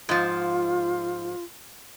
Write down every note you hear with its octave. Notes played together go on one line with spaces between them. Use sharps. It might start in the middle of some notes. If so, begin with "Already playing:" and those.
G#2 F3 F4